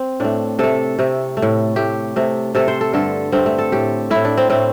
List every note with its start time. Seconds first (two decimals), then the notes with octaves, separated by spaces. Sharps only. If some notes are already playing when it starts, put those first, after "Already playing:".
Already playing: C4
0.20 A2 A3 D4
0.59 C3 A3 A4
0.99 C3 A3
1.37 A3
1.42 A2
1.76 A2 A3 G4
2.16 C3 A3
2.55 C3 A3 A4
2.68 C5
2.81 A4
2.93 G2 D3 A3 A4
3.32 G2 D3 A3 C4
3.46 A3
3.58 A4
3.72 A2 A3 G4
4.10 A2 A3 E4
4.25 D4
4.37 C4
4.50 A2 A3 C4